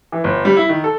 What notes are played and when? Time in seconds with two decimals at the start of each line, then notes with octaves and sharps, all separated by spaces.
0.12 E3
0.24 G1
0.45 G3
0.57 E4
0.69 D#3
0.84 A4